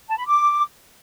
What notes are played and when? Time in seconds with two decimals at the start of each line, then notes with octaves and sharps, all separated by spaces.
0.08 A5
0.17 B5
0.27 D6